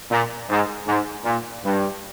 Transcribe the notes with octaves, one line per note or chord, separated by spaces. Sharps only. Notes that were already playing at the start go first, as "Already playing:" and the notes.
A#2
G#2
G#2
A#2
G2